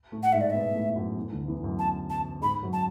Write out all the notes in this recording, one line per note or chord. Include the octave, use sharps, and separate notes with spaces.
A2 A3
F#5
G#2 G#3 E5
D5
B2 B3 E5
A2 A3
F#2 F#3
E2 E3
D2 D3
E2 E3
F#2 F#3
A5
A5
G#2 G#3 B5
F#2 F#3
A5